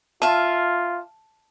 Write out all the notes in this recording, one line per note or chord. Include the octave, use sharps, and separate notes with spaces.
F4 E5 F5 A5